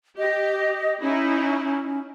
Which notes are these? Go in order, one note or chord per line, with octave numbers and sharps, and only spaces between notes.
G4 D#5
C#4 D#4 E4